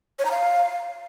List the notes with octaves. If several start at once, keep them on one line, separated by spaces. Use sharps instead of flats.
C#5
A#5
F5